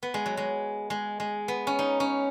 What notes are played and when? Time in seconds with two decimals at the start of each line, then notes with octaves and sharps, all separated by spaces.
0.03 B3
0.14 G#3
0.26 F#3
0.37 G#3
0.90 G#3
1.20 G#3
1.48 B3
1.67 C#4
1.79 D#4
2.00 C#4